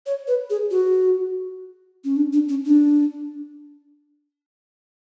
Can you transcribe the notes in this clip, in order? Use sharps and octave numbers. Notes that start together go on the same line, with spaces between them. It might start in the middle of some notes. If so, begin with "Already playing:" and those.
C#5
B4
G#4
F#4
C#4
D4
D4
C#4
D4